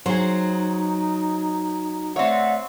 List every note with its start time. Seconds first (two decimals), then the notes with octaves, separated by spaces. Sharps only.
0.06 F#3 D#4 G#4 C5
2.16 A3 C4 C#5 D5 E5 F#5